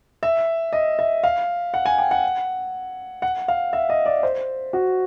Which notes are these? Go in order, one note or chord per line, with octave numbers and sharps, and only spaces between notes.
E5
D#5
E5
F5
F#5
G#5
G5
F#5
F#5
F5
E5
D#5
D5
C5
F#4